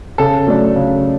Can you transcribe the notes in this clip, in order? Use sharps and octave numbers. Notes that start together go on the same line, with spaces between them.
C#3 A4
F#3 A3 D4
C#3